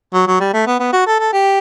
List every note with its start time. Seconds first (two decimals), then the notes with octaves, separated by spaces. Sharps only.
0.14 F#3
0.27 F#3
0.40 G3
0.54 A3
0.67 B3
0.80 B3
0.93 F#4
1.06 A4
1.20 A4
1.33 G4